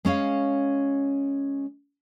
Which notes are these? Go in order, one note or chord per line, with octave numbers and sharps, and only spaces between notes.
G#3 C#4 C#5 F5